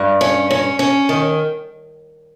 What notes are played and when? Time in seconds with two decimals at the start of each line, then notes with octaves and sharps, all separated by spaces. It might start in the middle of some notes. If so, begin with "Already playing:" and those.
Already playing: G2
0.21 C#4
0.51 C#4
0.79 C#4
1.09 D#3